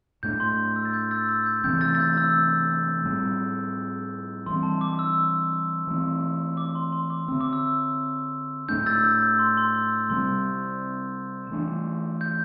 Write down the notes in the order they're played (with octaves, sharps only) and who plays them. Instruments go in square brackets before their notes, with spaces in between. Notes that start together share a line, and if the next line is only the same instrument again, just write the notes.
[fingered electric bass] A2 A3 D4 [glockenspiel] G6
[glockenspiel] C6
E6
A6
G6
E6 A6
E6 A6
G6
[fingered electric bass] C3 E3 A3 C4 [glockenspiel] G6
[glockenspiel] E6 A6
A6
G6
E6
[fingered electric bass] A2 G3 C4
[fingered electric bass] E3 G3 C4 [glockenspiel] C6
[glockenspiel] A5
D6
E6
[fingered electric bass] E3 A3 C4
[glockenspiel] D6
C6
C6
D6
[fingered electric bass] D3 C4 [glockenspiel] E6
[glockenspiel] D6
E6
[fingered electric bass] A2 A3 D4 [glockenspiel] G6
[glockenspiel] E6 A6
G6
E6
C6
C6
E6 A6
E6
[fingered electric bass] C3 G3 C4 [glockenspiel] C6
[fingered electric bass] E3 A3 D4
[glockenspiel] G6